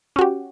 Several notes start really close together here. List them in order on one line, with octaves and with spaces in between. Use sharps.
C#4 F#4 G4